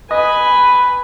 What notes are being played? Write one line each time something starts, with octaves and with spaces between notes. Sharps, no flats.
B4 D#5 G#5 B5